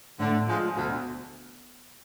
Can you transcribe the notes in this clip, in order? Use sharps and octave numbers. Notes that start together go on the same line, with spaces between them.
A2 D3
F3 G#3
D2 B2